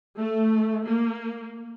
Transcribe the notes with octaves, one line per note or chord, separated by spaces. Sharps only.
A3
A#3